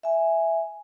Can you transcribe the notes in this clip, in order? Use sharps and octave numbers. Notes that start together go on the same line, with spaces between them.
E5 G#5